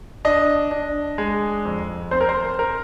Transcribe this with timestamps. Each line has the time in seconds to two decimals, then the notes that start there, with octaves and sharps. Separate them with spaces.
0.25 D4 D#5
0.71 D4
1.18 G#3
1.65 F2
2.11 C4 C5
2.21 A#4
2.29 C5
2.59 A#4